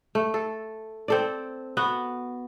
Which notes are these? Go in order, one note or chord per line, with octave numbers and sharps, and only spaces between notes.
A3
A4
C4 A4 D5
B3 F#4